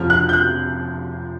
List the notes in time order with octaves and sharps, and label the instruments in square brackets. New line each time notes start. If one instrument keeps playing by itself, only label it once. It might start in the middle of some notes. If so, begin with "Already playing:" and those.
Already playing: [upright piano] F1 F2 C#3 F3 F6
F#6
G6
F#6